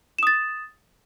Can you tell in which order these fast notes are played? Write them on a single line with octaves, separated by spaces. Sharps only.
E7 D#6 A6